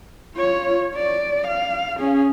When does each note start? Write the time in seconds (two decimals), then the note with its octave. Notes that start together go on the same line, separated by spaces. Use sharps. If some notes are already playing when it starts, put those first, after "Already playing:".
0.35 F4 C#5
0.96 D5
1.48 F5
1.99 C#4 G#4